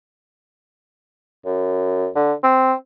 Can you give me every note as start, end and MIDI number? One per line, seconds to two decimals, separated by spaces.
1.45 2.07 42
2.15 2.33 50
2.44 2.73 60